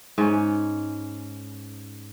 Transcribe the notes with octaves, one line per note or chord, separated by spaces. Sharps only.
G#2 C#4